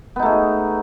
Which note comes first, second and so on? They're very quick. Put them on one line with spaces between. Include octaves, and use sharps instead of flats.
B3 D#4 A3 G#4